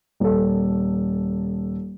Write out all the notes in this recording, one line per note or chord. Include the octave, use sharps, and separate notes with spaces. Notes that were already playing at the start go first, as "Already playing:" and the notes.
D#1 A4